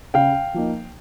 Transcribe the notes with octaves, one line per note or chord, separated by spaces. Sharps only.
C#3 F5 G5
F3 A#3 D#4